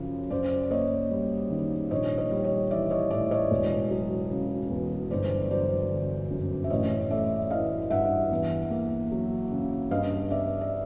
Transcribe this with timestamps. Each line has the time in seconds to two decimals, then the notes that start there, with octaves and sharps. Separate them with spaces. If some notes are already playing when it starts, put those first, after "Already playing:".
Already playing: F#2 C#3 F3
0.30 F#2 C5 D5
0.71 A#3 C#5 D#5
1.11 G3
1.50 D#3
1.91 A#1 C#5 D#5
2.18 C#5 D#5
2.31 G3
2.44 C#5 D#5
2.70 E3 D5 E5
2.90 C#5 D#5
3.10 A2 D5 E5
3.31 C#5 D#5
3.51 E1
3.91 F#3
4.31 C#3
4.70 E2
5.11 G1 C5 D5
5.51 F#3 C5 D5
5.91 D3
6.31 F#2
6.64 E5
6.70 A1 C#5 D#5
7.11 A3 D5 E5
7.50 E3 D#5 F5
7.90 G2 E5 F#5
8.31 E2
8.70 A#3
9.11 F#3
9.51 C#3
9.91 G2 D#5 F5
10.30 B3 D5 E5
10.61 E5